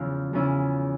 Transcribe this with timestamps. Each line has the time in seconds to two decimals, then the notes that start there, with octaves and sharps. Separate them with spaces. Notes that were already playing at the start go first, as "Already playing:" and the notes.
Already playing: E2 C#3 F3 C#4 E4 F5
0.33 E2 C#3 F3 C#4 E4